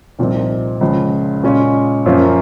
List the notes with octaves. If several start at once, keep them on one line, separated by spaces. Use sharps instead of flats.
C2 A#2 F3 C4 D#4
C#2 C#3 F3
A#2 G#3 C#4 F4
F#2 F3 A#3 C#4 F4